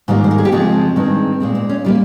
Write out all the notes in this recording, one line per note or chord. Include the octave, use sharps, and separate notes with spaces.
G#2 D#3 G3 A#3 F4
C5
A#4
G#4
G4
F2 C#3 F3 G#3 C4 F4
G2 D#3 G#3 C4
A#2 G#3 C4
C4
C#4
G3 A#3 F4